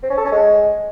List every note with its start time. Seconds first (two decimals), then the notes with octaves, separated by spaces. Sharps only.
0.03 C4
0.10 C#4
0.18 A4
0.25 C#4
0.32 G#3